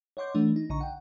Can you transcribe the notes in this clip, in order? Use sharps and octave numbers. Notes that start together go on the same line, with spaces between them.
C#5 D#5 F#5 C6 D6 G6
E3 A3 D4
D#4
A#1 D3 D#5 A#5 C#6
F#5 G5